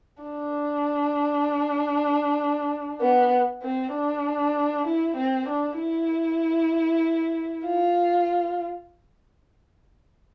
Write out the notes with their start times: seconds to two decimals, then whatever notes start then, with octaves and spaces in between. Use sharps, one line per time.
0.23 D4
3.01 B3
3.62 C4
3.94 D4
4.86 E4
5.17 C4
5.49 D4
5.79 E4
7.65 F4